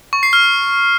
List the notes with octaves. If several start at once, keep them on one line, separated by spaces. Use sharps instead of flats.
C#6
C7
F6